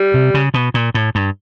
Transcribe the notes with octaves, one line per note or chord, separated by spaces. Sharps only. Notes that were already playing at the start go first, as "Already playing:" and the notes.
Already playing: G3
C3
C#3
B2
A#2
A2
G2